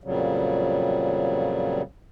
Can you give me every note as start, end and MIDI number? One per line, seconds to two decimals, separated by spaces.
0.04 1.82 41
0.04 1.82 46
0.04 1.82 49
0.04 1.82 54
0.04 1.82 55